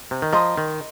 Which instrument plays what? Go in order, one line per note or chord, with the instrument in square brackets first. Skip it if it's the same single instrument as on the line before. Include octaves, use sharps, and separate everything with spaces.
[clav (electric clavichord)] C3
D#3
[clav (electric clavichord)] F3 [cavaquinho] A#4 D#5 C6 D#6
[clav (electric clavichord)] D#3